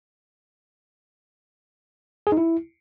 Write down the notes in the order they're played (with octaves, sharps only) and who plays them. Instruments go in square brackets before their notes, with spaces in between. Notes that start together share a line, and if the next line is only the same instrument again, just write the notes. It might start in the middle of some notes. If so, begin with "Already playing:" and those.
[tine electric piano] G#4
D#4
E4